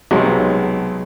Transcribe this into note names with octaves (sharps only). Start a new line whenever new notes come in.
B1 C3 F#3 G#3